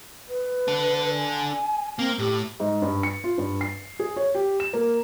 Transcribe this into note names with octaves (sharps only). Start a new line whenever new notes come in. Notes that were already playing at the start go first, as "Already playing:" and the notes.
B4
D4 A4
G#5
A#3 C4
A2 G4
G#2
G2
C#7
F4
G2
C7
G#4
C#5
G4
E7
A#3